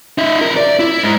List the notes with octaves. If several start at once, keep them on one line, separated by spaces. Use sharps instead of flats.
D#4 E5
F2 A#4
D5
E4
G#2